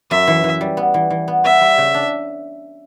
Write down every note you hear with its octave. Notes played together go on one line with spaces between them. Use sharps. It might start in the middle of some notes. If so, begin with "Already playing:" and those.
F#2 E5
E3
E3
G3
B3
E3
E3
B3
B3 E5
G3
C#3
D4